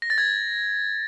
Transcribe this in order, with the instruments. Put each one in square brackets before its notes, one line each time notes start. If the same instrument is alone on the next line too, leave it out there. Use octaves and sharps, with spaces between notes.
[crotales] A#6
A6
G#6